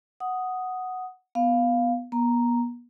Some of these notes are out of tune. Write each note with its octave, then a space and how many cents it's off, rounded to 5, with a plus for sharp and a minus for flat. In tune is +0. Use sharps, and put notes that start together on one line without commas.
F#5 +0 D#6 +0
B3 +0 F5 +0
B3 -40 A#5 +0